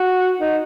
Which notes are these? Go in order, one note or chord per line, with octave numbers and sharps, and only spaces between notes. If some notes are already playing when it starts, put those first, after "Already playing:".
Already playing: F#4
D#4